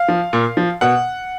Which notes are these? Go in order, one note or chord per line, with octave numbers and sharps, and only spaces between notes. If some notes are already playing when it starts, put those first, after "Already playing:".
Already playing: F5
F3
A#2
F3
B2 F#5